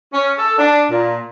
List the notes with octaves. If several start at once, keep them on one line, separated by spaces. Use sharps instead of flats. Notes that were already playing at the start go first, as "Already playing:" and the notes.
C#4
A4
D4
A#2